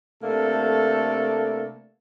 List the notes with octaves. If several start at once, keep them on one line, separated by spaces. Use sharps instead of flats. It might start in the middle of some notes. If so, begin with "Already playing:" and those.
C3 A3 A#3 D4 A4